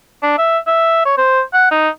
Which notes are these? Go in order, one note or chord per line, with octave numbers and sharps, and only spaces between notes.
D4
E5
E5
C#5
C5
F#5
D#4